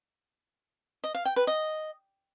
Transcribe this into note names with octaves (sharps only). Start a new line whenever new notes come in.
D#5
F5
G5
B4
D#5